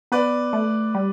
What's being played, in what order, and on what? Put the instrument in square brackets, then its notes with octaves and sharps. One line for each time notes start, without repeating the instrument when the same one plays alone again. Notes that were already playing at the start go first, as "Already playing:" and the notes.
[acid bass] B3 [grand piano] B4 D5
[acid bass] A3
G3